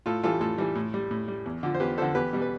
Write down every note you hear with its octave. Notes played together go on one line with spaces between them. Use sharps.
A2 F4 A4
E3 G3 F4 A4
A2 F4 A4
E3 G3
A2
G3
A2
G3
E2
D3 F3
C5
E2 G4 B4
D3 F3 A4 C5
E2 G4 B4
B2 G3
B4